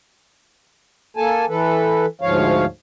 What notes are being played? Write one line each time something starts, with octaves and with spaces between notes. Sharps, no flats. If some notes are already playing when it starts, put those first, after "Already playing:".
A#3 A4 G#5 A5
E3 A4 B4
D2 G#2 F3 C#5 F5